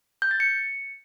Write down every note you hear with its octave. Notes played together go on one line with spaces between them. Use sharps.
G6
A6
C#7